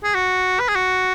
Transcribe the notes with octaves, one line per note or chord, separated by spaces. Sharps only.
G#4
F#4
B4
G#4
F#4